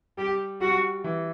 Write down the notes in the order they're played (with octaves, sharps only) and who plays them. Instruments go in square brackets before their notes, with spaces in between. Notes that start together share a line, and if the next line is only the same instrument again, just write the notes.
[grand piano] G3 [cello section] G4
[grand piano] G3 [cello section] F#4
[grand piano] E3